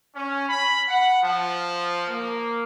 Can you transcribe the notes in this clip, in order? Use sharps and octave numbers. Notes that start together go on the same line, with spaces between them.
C#4
B5
F#5
F3
A#3